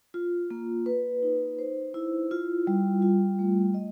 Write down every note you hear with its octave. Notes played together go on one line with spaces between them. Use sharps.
F4
A#3
B4
D#4
C5
E4
F4
G3
F4
A3
D#5